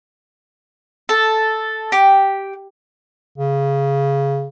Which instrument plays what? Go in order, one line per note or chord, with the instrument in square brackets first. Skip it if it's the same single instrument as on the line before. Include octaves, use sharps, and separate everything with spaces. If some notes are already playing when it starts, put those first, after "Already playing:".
[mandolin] A4
G4
[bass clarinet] C#3